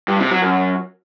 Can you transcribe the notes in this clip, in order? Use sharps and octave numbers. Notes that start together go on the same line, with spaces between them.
G2
C3
F#3
F#2